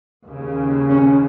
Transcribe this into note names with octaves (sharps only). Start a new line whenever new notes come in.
D#2 C#3
C#4